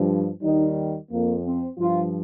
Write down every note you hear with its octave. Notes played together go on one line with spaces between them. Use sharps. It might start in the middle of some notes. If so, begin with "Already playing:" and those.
Already playing: G2 F3
D#2 D#3 G3 D#4
F2 F3 A#3
C4
G2 F3 F4